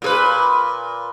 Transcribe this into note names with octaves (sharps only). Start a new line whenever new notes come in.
A#2 G#4 B4